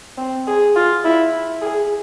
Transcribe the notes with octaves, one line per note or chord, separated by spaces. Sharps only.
C4
G#4
F4
E4
G#4